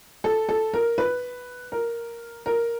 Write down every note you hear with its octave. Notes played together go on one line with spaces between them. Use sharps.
A4
A4
A#4
B4
A#4
A#4